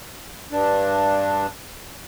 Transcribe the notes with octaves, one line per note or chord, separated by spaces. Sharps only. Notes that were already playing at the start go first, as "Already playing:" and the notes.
G2 D4